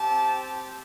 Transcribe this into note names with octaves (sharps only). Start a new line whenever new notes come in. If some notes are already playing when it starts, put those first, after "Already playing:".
Already playing: C4 G4 A5